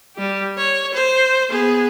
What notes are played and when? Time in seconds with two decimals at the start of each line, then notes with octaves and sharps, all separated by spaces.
0.16 G3 G4
0.58 C#5
0.94 C5
1.50 B3 G#4